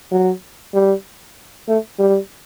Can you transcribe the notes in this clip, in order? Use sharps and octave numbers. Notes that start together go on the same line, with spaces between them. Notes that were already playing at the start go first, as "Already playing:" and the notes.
F#3
G3
A3
G3